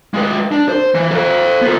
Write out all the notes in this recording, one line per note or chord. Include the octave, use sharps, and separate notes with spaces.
G#3 B4
D4
C5
E3
A4 C5
B3 F4